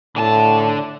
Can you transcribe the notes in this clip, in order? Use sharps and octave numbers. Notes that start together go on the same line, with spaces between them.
A2 D3 G#5 A5